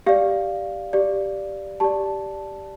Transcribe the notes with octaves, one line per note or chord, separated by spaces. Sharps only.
G4 D5 F5
G4 D5
G4 D5 A5